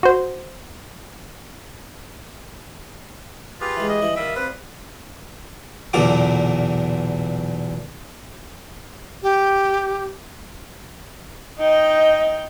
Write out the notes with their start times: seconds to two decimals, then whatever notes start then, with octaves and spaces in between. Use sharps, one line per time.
0.03 F#4 C5
3.61 F4 G4 G#4 B4
3.77 E3 G#3
3.89 D#5
4.02 E3 G3 E4
4.16 D#3 G3 E5 F5 G5 D#6
4.36 C4 B4
5.93 B1 E2 A#2 D3 D6
9.23 G4
11.58 D#4 D#5 G5